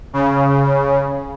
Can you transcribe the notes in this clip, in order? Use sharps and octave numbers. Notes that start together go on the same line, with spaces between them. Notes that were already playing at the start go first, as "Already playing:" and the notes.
C#3